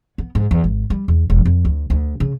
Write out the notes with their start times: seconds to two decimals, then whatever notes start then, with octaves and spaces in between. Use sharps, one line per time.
0.18 B3
0.35 G#2
0.51 E2
0.64 G#1
0.90 G3
1.08 E2
1.30 E1
1.45 F2
1.65 D2
1.90 D2
2.20 C#3